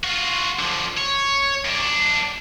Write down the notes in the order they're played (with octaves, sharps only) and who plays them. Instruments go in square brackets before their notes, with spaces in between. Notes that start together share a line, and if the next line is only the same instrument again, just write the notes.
[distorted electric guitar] F4 F#4
D3 F3
C#5
F#2 D4